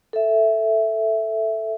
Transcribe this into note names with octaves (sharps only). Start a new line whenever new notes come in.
A4 E5